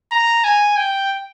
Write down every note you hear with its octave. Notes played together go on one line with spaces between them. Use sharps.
A#5
G#5
G5